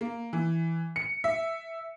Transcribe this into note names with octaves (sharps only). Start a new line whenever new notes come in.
A#3
E3
C#7
E5